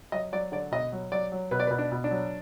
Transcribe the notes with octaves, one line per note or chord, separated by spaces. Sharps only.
F#3 D#5
F#3 D5
D3 D5
B2 D#5
F#3
F#3 D5
F#3
B2 B4
D5
B4
B2
D4
B2
D4
F#3